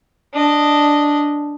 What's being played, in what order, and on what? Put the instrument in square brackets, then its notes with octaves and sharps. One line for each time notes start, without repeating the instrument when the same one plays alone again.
[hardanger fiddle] D4 D#5